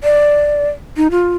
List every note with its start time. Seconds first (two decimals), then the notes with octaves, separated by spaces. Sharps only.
0.04 D5
0.97 D#4
1.11 F4